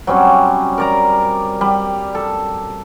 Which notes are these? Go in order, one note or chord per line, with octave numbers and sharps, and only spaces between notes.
F#3 G3 C4 C#4
A#4 D5 A#5
G3
A4